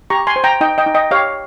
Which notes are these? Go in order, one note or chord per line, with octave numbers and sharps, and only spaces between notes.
G4 A#5 C#6
G#5 C6
C5
G5 A#5
D#4 D#5 G5
D#5 G5
D#4
D#5 G5
G4 C#5 F5